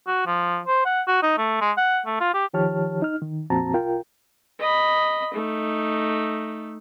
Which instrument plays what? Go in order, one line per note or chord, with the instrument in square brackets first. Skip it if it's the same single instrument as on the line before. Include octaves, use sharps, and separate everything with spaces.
[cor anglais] F#4
F3
C5
F#5
F#4
D#4
A3
G#3
F#5
A3
F4
G4
[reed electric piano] D#3 F3 G4 C#5 A5 F6
D#4 F6
D#3
F2 A#2 C4 F#4 A5 A#5
C2 F4 A#4 G5
[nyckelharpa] D#5 B5
A3 D#4